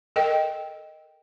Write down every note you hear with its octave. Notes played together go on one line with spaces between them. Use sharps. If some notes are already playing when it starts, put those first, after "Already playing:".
A4 A#4 D#5 G5